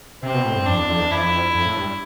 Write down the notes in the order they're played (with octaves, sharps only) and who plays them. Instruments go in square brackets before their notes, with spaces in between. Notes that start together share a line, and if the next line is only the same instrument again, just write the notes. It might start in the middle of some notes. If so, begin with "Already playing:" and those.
[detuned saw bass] C3 [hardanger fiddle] C4
[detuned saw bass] B2
A2
G2
[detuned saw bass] F2 [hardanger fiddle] D4
[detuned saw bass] E2
F2
E2
[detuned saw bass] F2 [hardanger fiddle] E4
[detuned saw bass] F2
A2
G2